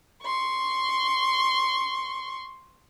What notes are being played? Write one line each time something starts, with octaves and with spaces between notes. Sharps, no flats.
C6 C#6